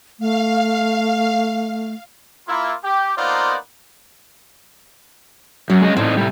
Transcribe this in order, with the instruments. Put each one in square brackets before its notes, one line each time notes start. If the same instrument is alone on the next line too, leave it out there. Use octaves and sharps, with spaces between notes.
[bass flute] A3 [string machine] F5
[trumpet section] A#3 E4 F4
G4
A#3 B3 D#4 F4 C5 D5
[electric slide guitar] F#2 [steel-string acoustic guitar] F#3
[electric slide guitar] G#3 C#4 D#5
[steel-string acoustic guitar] A2 [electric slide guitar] C4 D4 D#4
[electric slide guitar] C3 G3